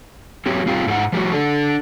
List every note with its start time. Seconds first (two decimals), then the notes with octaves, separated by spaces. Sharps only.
0.46 F#3 C4 G4 C#5
0.66 G3 C4 F4 G4 G5
0.87 G#2 E4 G#4 F#5
1.13 F3 G3 A3 F#4
1.32 D4 A4